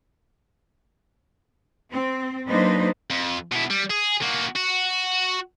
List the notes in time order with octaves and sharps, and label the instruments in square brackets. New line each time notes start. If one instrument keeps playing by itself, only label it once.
[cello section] C4
F#3 A#3 D4 D#4 B4 C5
[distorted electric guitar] F2
B2 E4
G3
G#4
A#3 F#4
F#4